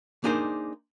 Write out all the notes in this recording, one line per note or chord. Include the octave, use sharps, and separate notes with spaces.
A#3 D4 D#4 G#4 A#4 C5